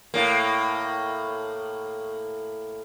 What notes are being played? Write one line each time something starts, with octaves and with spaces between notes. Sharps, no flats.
A2 A#3